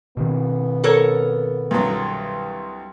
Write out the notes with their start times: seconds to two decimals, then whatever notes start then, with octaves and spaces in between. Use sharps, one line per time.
0.17 B2 D#3 B3 C4
0.84 A4 A#4 C#5
1.71 C2 G2 F#3